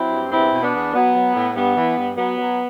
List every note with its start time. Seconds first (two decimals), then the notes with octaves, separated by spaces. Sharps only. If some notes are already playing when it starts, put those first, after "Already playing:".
Already playing: F#3 C4 E4
0.11 G2
0.32 E2 C4 E4
0.52 B2
0.63 B3 D4
0.73 E2
0.94 F#3 B3
1.15 F#3
1.35 A2
1.55 G2 B3
1.76 E3
1.97 G2
2.17 F#3 B3
2.37 F#3